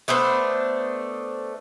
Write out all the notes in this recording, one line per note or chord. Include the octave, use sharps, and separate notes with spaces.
A3 B3 D4 C5